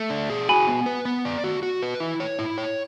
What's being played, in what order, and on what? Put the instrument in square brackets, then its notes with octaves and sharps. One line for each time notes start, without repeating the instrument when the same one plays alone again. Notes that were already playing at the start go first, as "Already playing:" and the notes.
Already playing: [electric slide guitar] A3
D4
G#4
[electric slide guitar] F#4 [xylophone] G#5 B5
[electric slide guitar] B3
B4
B3
D5
F#4
F#4
B4
E4
C#5
E4
C#5